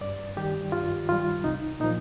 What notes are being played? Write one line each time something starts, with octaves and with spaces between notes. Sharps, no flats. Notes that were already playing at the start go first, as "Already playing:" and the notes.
G2 D5
D#3 G3 G4
G2 F4
D#3 G3 F4
C2 D#4
A#2 F3 D#4